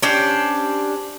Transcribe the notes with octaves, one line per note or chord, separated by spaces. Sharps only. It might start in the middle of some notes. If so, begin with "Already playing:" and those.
C#4 D4 G4 C5